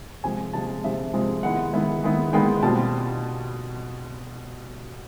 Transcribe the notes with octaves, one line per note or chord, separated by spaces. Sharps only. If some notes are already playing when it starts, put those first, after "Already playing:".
C3 F3 G#3 G#5
C3 F3 G#3 A5
C3 F3 G#3 E5
C3 F3 G#3
D#3 G#3 B3 E4 F#5
D#3 G#3 B3 E4
D#3 G#3 B3 E4
D#3 G#3 B3 E4 G5
B2 G3 C4 F4 A5